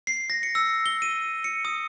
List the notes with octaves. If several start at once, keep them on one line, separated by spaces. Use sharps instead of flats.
C7
A#6
C#7
E6
G7
D#7
C#7
D#6